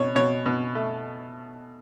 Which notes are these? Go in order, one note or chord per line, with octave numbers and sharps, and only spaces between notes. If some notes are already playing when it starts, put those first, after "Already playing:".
Already playing: B2 C#5
B2 C#5
B2
A3